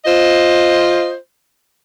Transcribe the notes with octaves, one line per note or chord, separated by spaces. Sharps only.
F4 C5 D#5